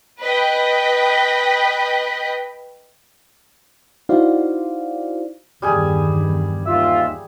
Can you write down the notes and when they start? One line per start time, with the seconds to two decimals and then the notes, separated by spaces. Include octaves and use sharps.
0.22 B4 D#5 G5 B5
4.09 D#4 E4 F#4 C5 D5 F5
5.62 E2 G2 D#3 G3 G#4 G#5
6.66 D#2 F4 E5 E6